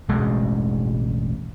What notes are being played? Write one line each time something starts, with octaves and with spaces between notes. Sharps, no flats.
E1 A1 G2 G#3